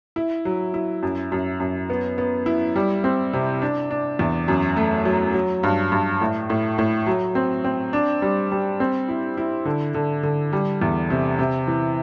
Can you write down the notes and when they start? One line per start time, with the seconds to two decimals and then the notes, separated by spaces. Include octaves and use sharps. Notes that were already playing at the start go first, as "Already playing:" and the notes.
0.16 E4
0.45 F#3
0.74 E4
1.03 F#2
1.32 F#2
1.60 F#2
1.90 B3
2.18 B3
2.46 E4
2.76 G3
3.04 C4
3.33 C3
3.62 D4
3.91 D4
4.19 E2
4.48 F#2
4.76 A3
5.05 F#3
5.34 F#3
5.63 G2
5.92 G2
6.21 A2
6.50 A2
6.78 A2
7.06 F#3
7.35 C4
7.64 C4
7.93 D4
8.22 G3
8.51 G3
8.80 C4
9.09 E4
9.37 E4
9.65 D3
9.94 D3
10.23 D3
10.53 G3
10.82 E2
11.10 C3
11.39 C3
11.67 E3